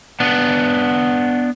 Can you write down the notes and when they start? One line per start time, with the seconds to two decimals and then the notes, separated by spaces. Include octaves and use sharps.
0.20 B3 D4